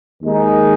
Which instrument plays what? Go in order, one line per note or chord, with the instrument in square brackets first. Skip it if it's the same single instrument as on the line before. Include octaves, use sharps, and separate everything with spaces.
[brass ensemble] D#2 D#3 G#3 D#4